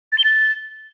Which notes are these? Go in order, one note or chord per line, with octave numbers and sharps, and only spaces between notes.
A6
G7
A6